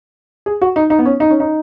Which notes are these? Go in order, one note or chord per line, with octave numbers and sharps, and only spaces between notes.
G#4
F#4
D#4
D#4
B3
C#4
D#4
C#4
D#4